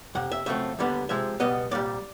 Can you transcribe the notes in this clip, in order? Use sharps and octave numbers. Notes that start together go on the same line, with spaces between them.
F2 C3 F#5
E5
F#2 C#3 F3 A3 C4 E5
D#2 D3 G3 B3
C3 F3 G#3 E5
C#2 B2 G3 B3 D#5
C2 A#2 G3 D5